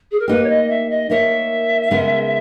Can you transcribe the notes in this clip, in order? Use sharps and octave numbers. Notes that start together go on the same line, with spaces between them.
G#4
A#4
A#3 D#4 G4 B4
C#5
D#5
E5
D#5
A#3 D#4 A#4 C#5 E5
C#3 G#3 B3 D#4 A#4